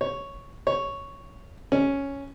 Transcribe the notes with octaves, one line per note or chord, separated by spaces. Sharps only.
C#5
C#5
C#4